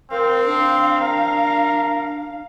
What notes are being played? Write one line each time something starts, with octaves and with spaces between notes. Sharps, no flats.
C4 A#4 F5
D4
A#4